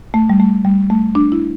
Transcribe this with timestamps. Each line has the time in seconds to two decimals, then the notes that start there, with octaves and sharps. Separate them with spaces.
0.14 A3
0.30 G3
0.40 A3
0.65 G3
0.90 A3
1.15 D4
1.32 E4